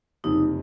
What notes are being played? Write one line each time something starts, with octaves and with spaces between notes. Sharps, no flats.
F#1 F2 C3 D#4